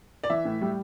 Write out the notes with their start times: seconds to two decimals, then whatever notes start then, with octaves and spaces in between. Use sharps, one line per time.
0.23 D5
0.30 E3 E5
0.45 A2
0.61 G3